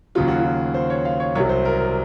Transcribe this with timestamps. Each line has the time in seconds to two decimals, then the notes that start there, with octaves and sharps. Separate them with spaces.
0.15 D#2 C#3 F#3 F4
0.28 F#4
0.39 F4
0.74 C5
0.90 C#5
1.05 F5
1.20 C#5
1.35 C2 C3 F#3 C#5
1.49 C5
1.65 A#4